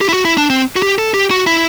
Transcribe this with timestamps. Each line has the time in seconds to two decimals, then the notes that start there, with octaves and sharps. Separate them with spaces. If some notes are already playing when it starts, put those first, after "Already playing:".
0.01 G4
0.09 E4
0.13 F#4
0.25 E4
0.38 D4
0.50 C4
0.76 F#4
0.82 G4
0.98 A4
1.14 G4
1.31 F#4
1.47 E4